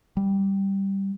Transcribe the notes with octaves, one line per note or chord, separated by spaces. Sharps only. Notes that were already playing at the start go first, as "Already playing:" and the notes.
G3